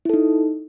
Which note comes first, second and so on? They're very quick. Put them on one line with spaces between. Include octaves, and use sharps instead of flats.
E4 A4 D#4